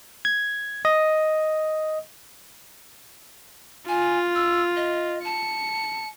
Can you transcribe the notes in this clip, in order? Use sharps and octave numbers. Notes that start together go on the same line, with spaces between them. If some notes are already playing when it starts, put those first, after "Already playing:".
G#6
D#5
F4 G#5
E6
D#5
A5 C#7